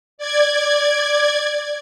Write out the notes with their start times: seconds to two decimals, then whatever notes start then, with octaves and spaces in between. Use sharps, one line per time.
0.18 D5 G#6